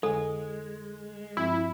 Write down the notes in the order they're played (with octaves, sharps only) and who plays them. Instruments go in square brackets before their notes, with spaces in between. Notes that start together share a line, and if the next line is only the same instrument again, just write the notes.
[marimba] F2 D3 G#5 [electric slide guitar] G#3 [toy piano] A4
[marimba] G2 F3 C4 [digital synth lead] E4